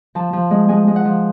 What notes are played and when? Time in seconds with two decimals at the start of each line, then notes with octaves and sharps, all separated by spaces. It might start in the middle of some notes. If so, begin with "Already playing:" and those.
0.15 F3 A5
0.33 F3
0.51 G#3
0.69 G#3 G#5
0.87 G#3
0.96 F#5
1.05 F3